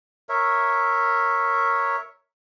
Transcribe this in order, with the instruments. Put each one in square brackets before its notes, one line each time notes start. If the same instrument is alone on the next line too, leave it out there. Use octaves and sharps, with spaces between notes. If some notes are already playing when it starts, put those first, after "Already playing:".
[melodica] A#4 C#5 E5